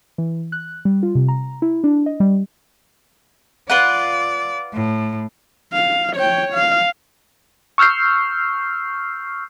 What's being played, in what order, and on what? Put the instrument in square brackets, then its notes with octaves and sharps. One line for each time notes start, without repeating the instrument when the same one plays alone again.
[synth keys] E3
F#6
G3
F4
C3
A#5
E4
D4
D#5
G3
[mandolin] F4 B4 F#5 [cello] D5
[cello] A2
[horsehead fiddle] F5
C#5 G5
F5
[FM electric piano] C#6 E6 F6 G6 C7